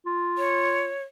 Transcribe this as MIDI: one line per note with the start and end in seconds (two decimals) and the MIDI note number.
0.06 0.92 65
0.38 1.03 73